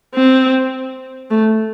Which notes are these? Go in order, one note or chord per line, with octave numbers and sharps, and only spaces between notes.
C4
A3